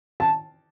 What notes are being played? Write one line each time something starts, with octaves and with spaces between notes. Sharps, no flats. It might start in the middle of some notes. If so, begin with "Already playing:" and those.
A5